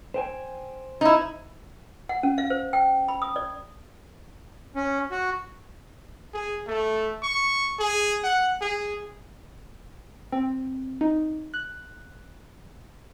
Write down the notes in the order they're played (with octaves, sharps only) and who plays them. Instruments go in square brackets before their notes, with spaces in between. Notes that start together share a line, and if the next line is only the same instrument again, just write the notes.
[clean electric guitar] C5 G5 G#5
[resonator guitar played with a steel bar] D#4 E4
[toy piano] F#5
C#4
F5
C5
G5
B5
D#6
D5
[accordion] C#4
F#4
[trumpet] G#4
A3
C#6
G#4
F#5
G#4
[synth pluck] C4
D#4
F#6